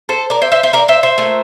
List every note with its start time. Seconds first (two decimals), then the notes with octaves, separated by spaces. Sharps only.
0.09 A4 C5
0.30 A#4 D5
0.42 C5 E5
0.52 C5 E5
0.63 C5 E5
0.73 A#4 D5
0.88 C5 E5
1.03 C5 E5
1.18 A#2 A3